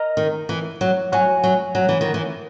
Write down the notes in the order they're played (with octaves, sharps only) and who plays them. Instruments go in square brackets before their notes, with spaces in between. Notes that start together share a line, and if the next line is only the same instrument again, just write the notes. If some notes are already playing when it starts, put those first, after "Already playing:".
Already playing: [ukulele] A#4 D#5 A#5
[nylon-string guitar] D#3
E3
F#3
[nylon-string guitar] F#3 [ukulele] F#4 C#5 G#5
[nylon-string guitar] F#3
F#3
E3
D#3
E3